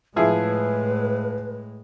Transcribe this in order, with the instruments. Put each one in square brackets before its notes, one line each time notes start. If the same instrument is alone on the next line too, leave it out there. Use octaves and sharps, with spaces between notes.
[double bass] A2 G#3 [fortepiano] F3 E4 G#4 [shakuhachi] B4